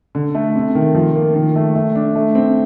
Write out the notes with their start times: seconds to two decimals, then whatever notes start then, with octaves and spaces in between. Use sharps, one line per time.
0.15 D3
0.35 A3
0.55 C3
0.75 D#3
0.95 F3
1.15 A#3
1.35 D#3
1.56 A3
1.75 A3
1.95 D4
2.15 A3
2.35 C4